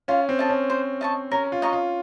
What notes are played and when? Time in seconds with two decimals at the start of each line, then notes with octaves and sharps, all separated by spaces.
0.08 C#4 F4
0.29 C4
0.39 A4 D#5
0.49 C#4
0.70 C5
1.01 D#5 A5 C#6
1.32 C#4 A#4
1.52 F4
1.62 D#5 A#5 C#6
1.73 F4